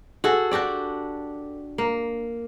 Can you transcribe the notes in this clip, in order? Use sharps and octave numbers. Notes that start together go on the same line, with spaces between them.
F#4 G#4 A4
D4 F#4 G4 D5
A#3